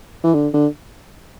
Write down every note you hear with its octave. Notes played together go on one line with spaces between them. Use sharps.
E3
D3
D3